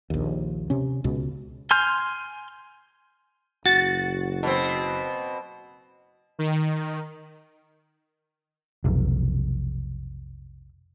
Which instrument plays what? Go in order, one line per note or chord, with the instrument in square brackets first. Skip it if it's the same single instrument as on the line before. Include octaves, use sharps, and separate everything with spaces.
[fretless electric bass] A#1 D#2
C3 C#4
C#2 B2
[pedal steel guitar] G#5 C6 F6 G6
[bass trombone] F#1 [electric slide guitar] F#4 [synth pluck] A6
[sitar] B2 C4
[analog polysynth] D#3
[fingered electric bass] F1 B1